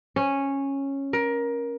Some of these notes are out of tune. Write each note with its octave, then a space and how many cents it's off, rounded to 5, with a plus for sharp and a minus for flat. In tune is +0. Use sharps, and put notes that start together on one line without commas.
C#4 -10
A#4 +20